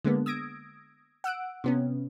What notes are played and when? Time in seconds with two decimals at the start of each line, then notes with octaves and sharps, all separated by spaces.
0.05 D3 G#3 A#3 B3
0.26 D#6 E6 G#6 A#6 D7
1.24 F#5 E6 F#6 D7
1.64 C3 B3 C#4